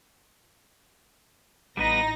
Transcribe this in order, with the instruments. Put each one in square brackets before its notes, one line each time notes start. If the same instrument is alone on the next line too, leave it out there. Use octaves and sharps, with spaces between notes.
[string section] A1 D#4 A#6 [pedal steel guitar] G3 B3 B4